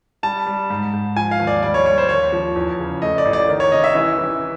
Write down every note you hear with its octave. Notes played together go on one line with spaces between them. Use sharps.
G3 A5
G3
G#2
G#2
F3 G#5
F5
D#2
D5
G3 D5
C#5
G3 C#5
C5
D#2 C#5
F3
E2
C#3
A3 D#5
D5
A1
D5
D#3
C#5
C3 D#5
E5
E3
E3